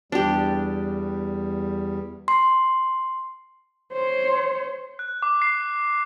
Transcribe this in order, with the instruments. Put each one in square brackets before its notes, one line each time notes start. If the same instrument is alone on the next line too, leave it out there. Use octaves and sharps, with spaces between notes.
[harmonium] E2 G3 [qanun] D4 G4
[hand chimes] C6
[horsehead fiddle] C5 C#5
[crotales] F#6
D6
C7